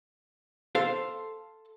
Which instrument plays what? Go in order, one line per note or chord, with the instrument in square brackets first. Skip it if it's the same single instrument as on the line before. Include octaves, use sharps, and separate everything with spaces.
[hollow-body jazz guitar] A4 C5 F5